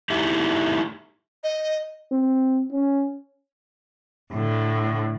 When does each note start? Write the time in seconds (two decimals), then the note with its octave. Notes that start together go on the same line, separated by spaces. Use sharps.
0.10 A3 D#4 E4 G4
1.44 D#5
2.12 C4
2.72 C#4
4.32 A2 D3